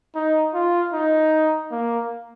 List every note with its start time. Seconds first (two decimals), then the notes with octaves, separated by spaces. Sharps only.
0.15 D#4
0.54 F4
0.93 D#4
1.71 A#3